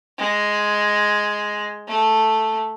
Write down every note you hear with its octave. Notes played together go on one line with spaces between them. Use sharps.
G#3
A3